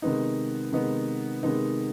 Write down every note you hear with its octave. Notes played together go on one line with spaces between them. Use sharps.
C3 D#3 G#3 B3 D#4
C3 D#3 G#3 B3 D#4
C3 D#3 G#3 B3 D#4